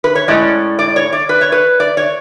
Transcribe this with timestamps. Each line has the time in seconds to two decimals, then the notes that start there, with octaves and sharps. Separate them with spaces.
0.04 B4
0.15 C#5
0.28 A2 G#3 C#4 D5
0.79 D5
0.96 C#5
1.13 D5
1.29 B4
1.41 C#5
1.52 B4
1.80 D5
1.97 C#5